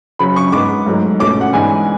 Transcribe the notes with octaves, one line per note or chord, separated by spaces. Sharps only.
C#3 F#3 C#4 B5
C#6
G#2 G#3 B3 D6
G#2 F#3 A3
B2 A3 C#4 D6
F#5
G#2 E3 B3 D4 G#5